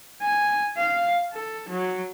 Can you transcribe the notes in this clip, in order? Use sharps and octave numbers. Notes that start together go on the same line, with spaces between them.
G#5
F5
A4
F#3